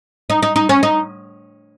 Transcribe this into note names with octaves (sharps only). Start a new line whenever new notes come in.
D#4
D#4
D#4
C#4
D#4